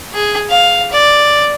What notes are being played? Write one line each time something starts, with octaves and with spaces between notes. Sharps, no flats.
G#4
F5
D5